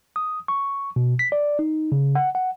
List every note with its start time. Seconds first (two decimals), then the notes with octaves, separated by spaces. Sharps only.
0.16 D#6
0.48 C#6
0.96 B2
1.19 B6
1.32 D5
1.59 D#4
1.92 C#3
2.15 F#5
2.35 F#5